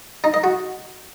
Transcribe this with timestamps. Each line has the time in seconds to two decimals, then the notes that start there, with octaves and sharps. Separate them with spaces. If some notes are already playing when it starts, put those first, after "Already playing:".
0.24 D#4
0.34 D#5
0.44 F#4